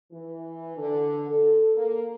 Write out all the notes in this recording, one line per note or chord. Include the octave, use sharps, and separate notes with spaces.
E3
D3
A4
A#3